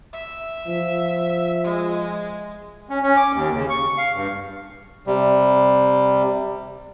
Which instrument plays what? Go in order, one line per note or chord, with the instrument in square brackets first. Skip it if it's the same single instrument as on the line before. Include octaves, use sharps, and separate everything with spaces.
[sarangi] E5
[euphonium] F3
[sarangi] G#3
[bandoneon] C#4
C#4
D6
D#2
C#3
C#6
F5
G2
C3 G3